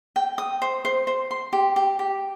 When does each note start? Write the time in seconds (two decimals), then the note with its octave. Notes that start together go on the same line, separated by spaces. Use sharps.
0.16 G5
0.38 D#6
0.62 C5
0.85 C5
1.07 C5
1.31 C6
1.53 G4
1.76 G4
1.99 G4